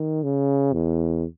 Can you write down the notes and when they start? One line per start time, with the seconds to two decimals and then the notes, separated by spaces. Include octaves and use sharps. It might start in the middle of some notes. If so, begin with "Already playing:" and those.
Already playing: D#3
0.23 C#3
0.73 E2